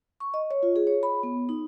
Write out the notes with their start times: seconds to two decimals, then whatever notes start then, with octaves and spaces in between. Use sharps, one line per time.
0.20 C#6
0.34 D#5
0.51 C#5
0.63 F4
0.76 G#4
0.87 C#5
1.03 B5
1.23 B3
1.49 D#4